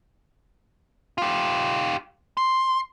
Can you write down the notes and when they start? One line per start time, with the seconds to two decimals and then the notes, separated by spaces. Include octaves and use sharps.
1.18 F4 G4
2.37 C6